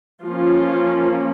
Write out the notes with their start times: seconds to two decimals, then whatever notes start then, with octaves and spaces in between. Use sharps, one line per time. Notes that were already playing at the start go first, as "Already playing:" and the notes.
0.23 F3 A#3 C#4 F4